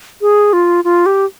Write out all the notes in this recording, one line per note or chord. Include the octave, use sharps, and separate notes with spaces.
G#4
F4
F4
G4